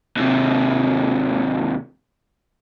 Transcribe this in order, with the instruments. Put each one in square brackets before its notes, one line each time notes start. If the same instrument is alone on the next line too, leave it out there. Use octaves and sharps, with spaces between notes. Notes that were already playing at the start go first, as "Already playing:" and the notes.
[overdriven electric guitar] D#2 C3